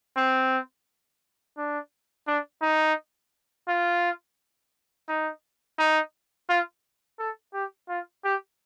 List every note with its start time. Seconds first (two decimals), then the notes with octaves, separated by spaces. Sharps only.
0.16 C4
1.57 D4
2.28 D4
2.62 D#4
3.68 F4
5.09 D#4
5.78 D#4
6.49 F4
7.19 A4
7.54 G4
7.89 F4
8.24 G4